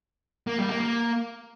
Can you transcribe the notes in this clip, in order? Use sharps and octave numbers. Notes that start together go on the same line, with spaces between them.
A#3
G3
A#3
A#3